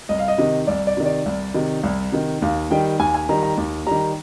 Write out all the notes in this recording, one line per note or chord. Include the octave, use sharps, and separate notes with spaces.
C2 D#5
F5
D#5
C3 D#3
C2 D5
D5
C3 D#3
D5
C2
C3 D#3
C2
C3 D#3
D#2 F5
D#3 G3 G5
D#2 G#5
G#5
D#3 G3 A#5
A#5
D#2
D#3 G3 A#5